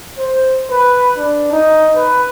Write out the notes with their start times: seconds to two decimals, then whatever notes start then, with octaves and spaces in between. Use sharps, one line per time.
0.18 C5
0.70 B4
1.18 D4
1.52 D#4
1.96 B4